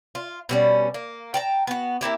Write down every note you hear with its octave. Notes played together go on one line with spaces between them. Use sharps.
F4
B2 G3 C#4
A#3
G5 A5 A#5
B3 F#4
A#3 C4 E4 G4